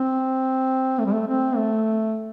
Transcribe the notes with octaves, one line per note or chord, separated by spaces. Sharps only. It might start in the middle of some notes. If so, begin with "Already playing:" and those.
Already playing: C4
A3
G3
A3
C4
A3